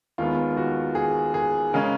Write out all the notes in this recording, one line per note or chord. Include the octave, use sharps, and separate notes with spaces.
D#2 D#3 G#3 B3 F4
F#4
G#4
G#4
C#3 G#3 C#4 A#4